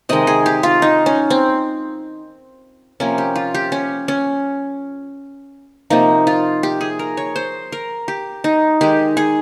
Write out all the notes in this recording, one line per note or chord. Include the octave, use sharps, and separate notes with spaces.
C3 D#3 G#3 D#5
G#4
G4
F4
D#4
C#4
C4
C3 F3 A#3 C#4
G4
F4
G4
C#4
C#4
C3 F3 A#3 D#4
F4
G4
G#4
A#4
C#5
C5
A#4
G4
D#4
D#3 G#3 G4
G#4